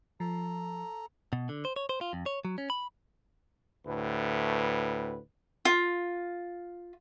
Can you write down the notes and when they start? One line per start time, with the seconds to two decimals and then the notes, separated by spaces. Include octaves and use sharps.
0.20 F3 A4 A#5
1.33 B2
1.49 D3
1.65 C5
1.76 C#5
1.89 C5
2.01 F4
2.13 F2
2.26 C#5
2.45 F#3
2.58 C#4
2.70 B5
3.86 D2 A2 B4
5.65 F4